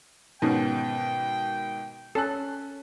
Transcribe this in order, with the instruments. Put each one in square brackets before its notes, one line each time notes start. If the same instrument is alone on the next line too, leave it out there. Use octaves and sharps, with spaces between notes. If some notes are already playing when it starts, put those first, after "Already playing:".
[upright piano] G#2 B2 D#3 [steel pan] B3 C#4 G#4 [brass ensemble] G5
[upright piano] C#4 F#6 [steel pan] A4